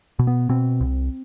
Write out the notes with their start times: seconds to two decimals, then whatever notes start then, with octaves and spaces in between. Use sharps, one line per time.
0.19 B2
0.27 B3
0.49 B2 C4
0.80 C2